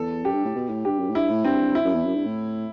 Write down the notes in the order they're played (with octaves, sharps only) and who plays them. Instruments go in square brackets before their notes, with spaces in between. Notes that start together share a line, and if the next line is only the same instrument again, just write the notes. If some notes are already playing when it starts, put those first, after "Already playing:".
Already playing: [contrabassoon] E2 [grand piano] A4
[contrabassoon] F#2 [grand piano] G4
[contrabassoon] G2
A2
B2
A2
[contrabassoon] G2 [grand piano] G4
[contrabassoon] F#2
A2
[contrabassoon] G2 [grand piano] E4
[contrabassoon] A2
[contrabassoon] G2 [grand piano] C4
[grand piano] E4
[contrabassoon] F#2
E2
F#2
G2
A2